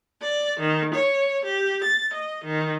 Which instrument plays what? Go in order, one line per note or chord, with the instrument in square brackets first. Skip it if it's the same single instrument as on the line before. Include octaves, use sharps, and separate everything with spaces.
[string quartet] D5
D#3
C#5
G4
A6
D#5
D#3